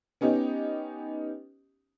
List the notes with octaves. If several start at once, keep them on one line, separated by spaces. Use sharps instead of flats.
B3 C#4 D#4 G4